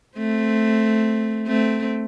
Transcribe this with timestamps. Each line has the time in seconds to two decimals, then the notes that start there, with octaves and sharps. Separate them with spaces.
0.18 A3 C4
1.47 A3 C4